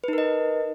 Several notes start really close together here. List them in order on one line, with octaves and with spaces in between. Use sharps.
B4 D#4 A#4 D#5